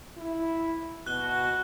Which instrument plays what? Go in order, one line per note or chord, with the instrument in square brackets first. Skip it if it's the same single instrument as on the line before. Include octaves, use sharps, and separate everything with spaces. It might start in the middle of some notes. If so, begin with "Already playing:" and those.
[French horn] E4
[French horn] B2 [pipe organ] F#4 [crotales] F#6 G7